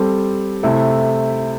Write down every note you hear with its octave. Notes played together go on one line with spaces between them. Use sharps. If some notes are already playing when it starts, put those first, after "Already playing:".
Already playing: G3 C4 A4
C3 A3 E4 A4